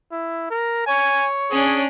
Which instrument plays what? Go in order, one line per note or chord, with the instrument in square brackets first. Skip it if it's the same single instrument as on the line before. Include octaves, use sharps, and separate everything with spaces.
[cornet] E4
A#4
[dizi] C#5 [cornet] G#5
[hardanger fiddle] C#4 D4 [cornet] G#4